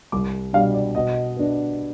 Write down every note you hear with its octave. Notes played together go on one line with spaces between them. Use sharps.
C2 D6
B2 G3 D4 F5
D5
B2 D#5
B3 D4